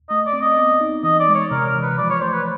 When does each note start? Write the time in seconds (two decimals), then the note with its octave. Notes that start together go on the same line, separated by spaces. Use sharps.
0.09 A3 D#5
0.26 D5
0.33 C4
0.42 D#5
0.57 B3
0.81 D#4
1.03 E3 D#5
1.20 D5
1.28 G#3
1.35 C#5
1.51 C3 A#4
1.66 A#4
1.74 E3
1.82 B4
1.98 F3 D5
2.10 C#5
2.22 A3 C5
2.33 B4